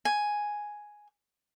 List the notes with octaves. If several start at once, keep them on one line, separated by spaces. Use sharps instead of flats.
G#5